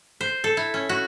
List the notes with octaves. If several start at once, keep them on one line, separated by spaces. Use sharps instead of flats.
C5
A4
E4
C#4
F#4